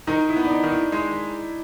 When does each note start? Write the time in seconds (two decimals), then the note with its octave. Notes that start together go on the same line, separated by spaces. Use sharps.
0.07 D#3 D#4
0.29 E4
0.36 B3
0.45 D4
0.50 D#4
0.64 D#3
0.71 E4
0.92 G#3